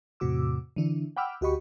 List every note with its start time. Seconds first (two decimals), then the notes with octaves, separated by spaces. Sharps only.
0.20 E2 A2 C3 F#4 D6 E6
0.76 D3 E3 D4 E4
1.17 F#5 G5 B5 D6 E6 F6
1.41 D2 F#4 G4 D#5 B5 C#6